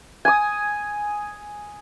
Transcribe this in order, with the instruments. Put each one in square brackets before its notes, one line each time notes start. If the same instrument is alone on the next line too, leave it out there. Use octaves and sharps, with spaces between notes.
[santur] G#5 D#6